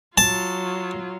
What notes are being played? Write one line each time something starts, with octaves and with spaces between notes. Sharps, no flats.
F#3 F4 A5